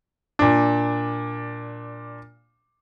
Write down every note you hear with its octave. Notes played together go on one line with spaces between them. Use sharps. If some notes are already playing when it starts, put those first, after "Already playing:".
A#2 D4